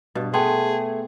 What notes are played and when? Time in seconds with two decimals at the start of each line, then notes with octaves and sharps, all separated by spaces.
0.15 G2 B2
0.34 A3 B3 G#4 G5 A5 C6